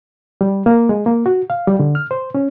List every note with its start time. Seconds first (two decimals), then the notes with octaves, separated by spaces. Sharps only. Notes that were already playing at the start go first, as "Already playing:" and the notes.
0.41 G3
0.66 A#3
0.89 G#3
1.06 A#3
1.26 F#4
1.50 F5
1.67 G3
1.80 D3
1.95 F6
2.11 C5
2.35 C#4